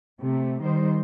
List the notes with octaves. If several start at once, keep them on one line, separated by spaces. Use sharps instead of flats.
C3 A3
D#3 G3 C5